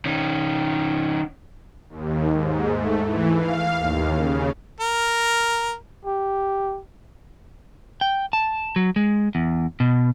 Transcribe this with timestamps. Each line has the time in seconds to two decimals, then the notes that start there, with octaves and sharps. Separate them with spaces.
0.06 D#3 C#4
1.89 D#2
2.32 G#2
2.73 A3
3.05 E3
3.36 F5
3.76 D#2
4.13 C#3
4.80 A#4
6.06 G4
8.01 G5
8.33 A5
8.76 F#3
8.96 G#3
9.35 E2
9.80 B2